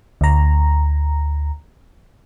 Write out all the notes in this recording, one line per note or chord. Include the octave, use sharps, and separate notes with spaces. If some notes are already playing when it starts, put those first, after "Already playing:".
D2 A#5